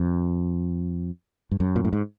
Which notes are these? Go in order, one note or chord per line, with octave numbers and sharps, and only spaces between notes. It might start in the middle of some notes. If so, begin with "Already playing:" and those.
Already playing: F2
G2
F#2
A#2
A2
G#2